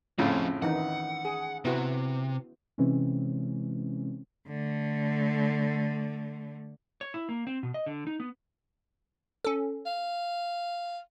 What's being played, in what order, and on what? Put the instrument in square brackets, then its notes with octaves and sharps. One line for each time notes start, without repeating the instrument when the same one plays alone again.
[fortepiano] F2 A2 C#3 [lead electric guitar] F3 C#4 [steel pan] F4
[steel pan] D#3 E3 D#4 [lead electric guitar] F#5
[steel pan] G#4
[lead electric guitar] C3 [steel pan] B3 E4 F#4
[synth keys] C3 E3 G#3 C4 C#4
[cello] D3 A3
[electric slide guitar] C#5
E4
A#3
C4
B2
D#5
D3
D#4
B3
[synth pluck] C#4 A4
[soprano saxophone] F5